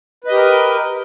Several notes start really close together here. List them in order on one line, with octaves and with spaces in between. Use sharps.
B4 D#5 G4 A#4